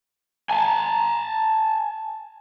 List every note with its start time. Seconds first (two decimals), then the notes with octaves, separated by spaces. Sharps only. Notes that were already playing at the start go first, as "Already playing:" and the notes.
0.50 G#5 A5